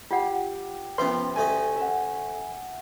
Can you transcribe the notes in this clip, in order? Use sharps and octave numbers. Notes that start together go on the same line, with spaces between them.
F4 G4 F#5
C3 F3 B3 C#4 B4 C6
D2 A3 D#5 G#5
E5 F#5